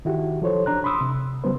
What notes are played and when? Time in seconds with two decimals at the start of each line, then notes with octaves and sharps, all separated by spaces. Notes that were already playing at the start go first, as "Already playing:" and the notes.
0.05 D#3 E4 F#4 G4
0.42 F3 A4 C5 C#5
0.66 D4 A#5 F#6
0.84 B5 C6 D#6 E6
1.01 C3
1.44 C#3 F#3 G3 B3 B4 C5